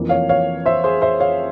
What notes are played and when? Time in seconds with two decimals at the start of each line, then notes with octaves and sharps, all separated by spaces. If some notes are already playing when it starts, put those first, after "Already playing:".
Already playing: F1 F2 E3 A#3
0.09 C#5 F5
0.29 C#5 F5
0.66 C5 E5
0.84 G#4 C5
1.02 C5 E5
1.20 C#5 F5